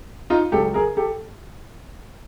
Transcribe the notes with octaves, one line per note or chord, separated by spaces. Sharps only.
D#4 F4
C#2 C#3 F#3 G4 A4
G#4 A#4
G4 A4